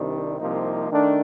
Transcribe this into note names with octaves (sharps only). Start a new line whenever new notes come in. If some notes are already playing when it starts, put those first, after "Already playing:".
Already playing: C2 C3 D#3 G3 D4
C2 C3 F3 A#3 D#4
D#3 A3 D4